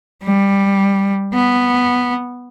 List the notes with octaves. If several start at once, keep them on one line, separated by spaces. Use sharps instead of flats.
G3
B3